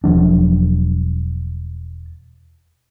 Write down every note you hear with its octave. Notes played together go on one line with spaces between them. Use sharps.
E1 F3 F#3 D4